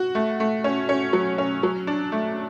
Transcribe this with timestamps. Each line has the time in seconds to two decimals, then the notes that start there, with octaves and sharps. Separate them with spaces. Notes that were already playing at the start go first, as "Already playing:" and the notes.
Already playing: F#4
0.15 A3
0.40 A3
0.64 C#4
0.89 C#4
1.13 F#3
1.38 C#4
1.63 F#3
1.87 D4
2.12 A3